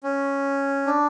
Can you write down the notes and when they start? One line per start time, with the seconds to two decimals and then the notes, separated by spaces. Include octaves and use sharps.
0.03 C#4
0.86 D4